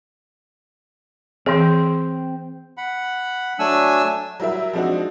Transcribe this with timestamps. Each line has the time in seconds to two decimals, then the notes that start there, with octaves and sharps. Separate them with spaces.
1.46 E3 C4 G#4
2.78 F#5 B5
3.59 F#3 A3 D4 G#5 E6
4.40 F#3 G3 E4 A#4 E5
4.73 F3 G#3 C4 D4 D#4 F#4